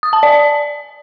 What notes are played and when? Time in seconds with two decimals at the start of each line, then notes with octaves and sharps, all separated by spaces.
0.03 D#6
0.13 A5
0.23 D5